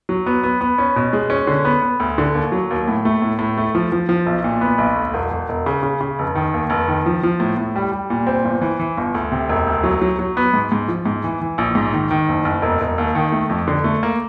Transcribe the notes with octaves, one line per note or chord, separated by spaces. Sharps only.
F#3
B3
B3
B3
C#4
B2
G#3
C#4
D3
B3
B3
D2
D3
D#2
F#3
D#2
A2
A3
A2
A2
A3
F3
F3
F3
B1
A#2
B3
B1
D2
E1
E1
E1
C#3
C#3
C#3
F1
D#3
D#2
F1
D#3
F3
F3
A2
A2
G3
G3
A#2
C4
G1
E3
E3
G1
D2
C3
E1
D2
F#3
F#3
F#3
B3
G#2
G#2
F3
G#2
E3
E3
A#1
G#2
D#3
D#3
F#1
F#1
E1
E1
D#2
D#3
A3
F2
D3
A3
A#3